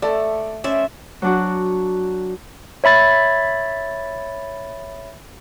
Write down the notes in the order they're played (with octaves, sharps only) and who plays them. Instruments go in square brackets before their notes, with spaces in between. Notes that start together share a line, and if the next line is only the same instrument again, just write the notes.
[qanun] A3 [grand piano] A4 D5
[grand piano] C#4 [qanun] C5 D5 E5
[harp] F#3 D4 F#4
[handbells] C#5 E5 B5 A6